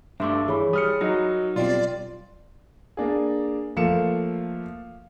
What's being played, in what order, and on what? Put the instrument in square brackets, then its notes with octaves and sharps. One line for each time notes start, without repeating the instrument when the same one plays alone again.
[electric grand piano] G2 [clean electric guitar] A3 D4 [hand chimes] E5 C6 D6
[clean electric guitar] E3 [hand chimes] G#4 C#5 B5
[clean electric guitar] G3 [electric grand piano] D#6 F6 C#7
[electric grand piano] F#3 D#5 [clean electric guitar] D#4 [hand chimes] A#4 A#6
[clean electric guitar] B1 G3 C4 [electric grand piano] F4 [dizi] D5
[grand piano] A#3 D4 G#4
[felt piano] F3 A3 A#3 [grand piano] F5 C#7 E7